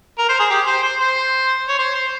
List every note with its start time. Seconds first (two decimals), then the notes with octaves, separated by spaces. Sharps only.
0.18 A#4
0.29 C5
0.40 G#4
0.50 G4
0.67 C5
0.83 C5
0.99 C5
1.69 C#5
1.79 C5
1.95 C5